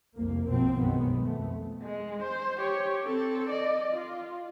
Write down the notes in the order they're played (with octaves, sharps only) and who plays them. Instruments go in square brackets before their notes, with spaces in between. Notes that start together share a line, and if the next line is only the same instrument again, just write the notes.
[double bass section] C2 F2 A#3
B1 F#2 B2 F3 C4
B1 F#2 B2 D#3 G#3 B3
F2 A3
[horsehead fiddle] G#3
C5
G4 C#5
C4 A4
D5 D#5
F4